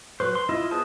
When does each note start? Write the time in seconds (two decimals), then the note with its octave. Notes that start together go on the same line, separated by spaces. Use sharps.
0.20 F#3 B4 C5
0.35 C6
0.49 E4 F4 D#5
0.71 B3 G#4 C5 D#5 A5